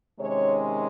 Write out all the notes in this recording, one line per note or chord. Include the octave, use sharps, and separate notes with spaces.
C3 D#3 G#3 C#4 C#5